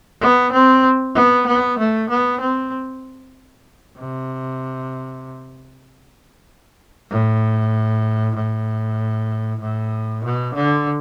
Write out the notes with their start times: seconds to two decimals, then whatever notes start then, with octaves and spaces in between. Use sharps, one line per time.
0.21 B3
0.52 C4
1.15 B3
1.47 B3
1.78 A3
2.10 B3
2.40 C4
3.98 C3
7.10 A2
8.35 A2
9.61 A2
10.24 B2
10.55 D3